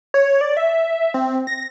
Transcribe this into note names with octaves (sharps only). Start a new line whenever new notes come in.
C#5
D5
E5
C4
A#6